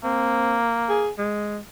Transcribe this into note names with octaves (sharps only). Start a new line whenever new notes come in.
A#3 C4
G#4
G#3